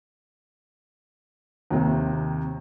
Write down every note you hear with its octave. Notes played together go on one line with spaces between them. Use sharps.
D#2 C3 D#3